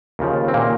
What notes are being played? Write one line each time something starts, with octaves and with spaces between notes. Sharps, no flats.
D#2 C#3 F3
C4
A#2 A#3